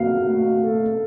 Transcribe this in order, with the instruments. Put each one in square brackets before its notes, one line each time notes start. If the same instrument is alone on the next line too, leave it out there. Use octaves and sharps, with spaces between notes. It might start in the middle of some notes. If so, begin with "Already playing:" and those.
Already playing: [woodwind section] F#4 [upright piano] F5
[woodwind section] A3
A4